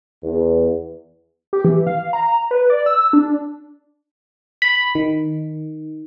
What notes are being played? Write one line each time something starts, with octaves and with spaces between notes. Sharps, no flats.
E2
G4
E3
F5
A#5
B4
D5
E6
D4
B5
D#3